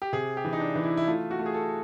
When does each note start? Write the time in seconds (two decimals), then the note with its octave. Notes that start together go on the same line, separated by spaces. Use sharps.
0.02 G4
0.13 C3 G#4
0.37 G4
0.45 E3
0.53 D#4
0.60 D4
0.75 E3
0.84 E4
0.97 E4
1.07 A3 F4
1.31 F#4
1.39 A3
1.46 G#4
1.54 A4